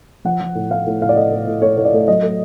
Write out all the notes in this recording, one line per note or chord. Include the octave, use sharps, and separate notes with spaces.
F3 F#5
F3
A2
A2 F5
A2
A2 F5
D5
A3 D#5
A2
A2
A3 C#5
A2 C#5
D5
A3
F#3 D#5
A3